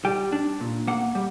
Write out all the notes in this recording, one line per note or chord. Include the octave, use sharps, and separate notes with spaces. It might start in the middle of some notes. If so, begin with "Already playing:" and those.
G3 G5
D4
A#2
A#3 F#5
G3